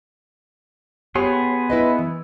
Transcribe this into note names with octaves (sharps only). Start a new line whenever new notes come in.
B3 G4 G#4 C#5 G#5 C6
E4 B4 D#5
E3